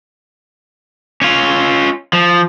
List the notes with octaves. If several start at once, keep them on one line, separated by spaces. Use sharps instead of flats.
C#4 F4
F3